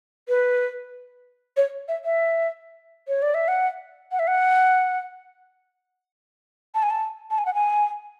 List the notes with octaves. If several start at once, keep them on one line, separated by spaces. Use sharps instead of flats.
B4
C#5
E5
E5
C#5
D5
E5
F#5
F#5
E5
F#5
A5
G#5
A5
A5
G#5
F#5
G#5